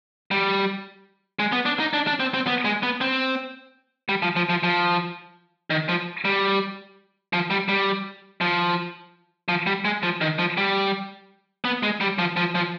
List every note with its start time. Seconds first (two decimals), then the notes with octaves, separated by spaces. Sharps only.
0.31 G3
1.39 G#3
1.52 B3
1.66 D4
1.80 D#4
1.93 D4
2.07 D4
2.20 C4
2.34 C4
2.47 B3
2.65 G#3
2.83 B3
3.01 C4
4.09 G3
4.22 F3
4.36 F3
4.49 F3
4.63 F3
5.70 D#3
5.89 F3
6.25 G3
7.33 F3
7.50 G3
7.69 G3
8.41 F3
9.48 F3
9.67 G3
9.85 G#3
10.03 F3
10.21 D#3
10.39 F3
10.57 G3
11.64 B3
11.83 G#3
12.01 G3
12.19 F3
12.37 F3
12.55 F3